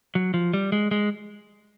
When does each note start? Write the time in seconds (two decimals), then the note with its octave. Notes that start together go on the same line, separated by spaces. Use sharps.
0.15 F#3
0.34 F3
0.54 G3
0.72 G#3
0.91 G#3